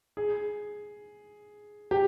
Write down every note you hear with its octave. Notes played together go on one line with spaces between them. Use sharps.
G#4
G4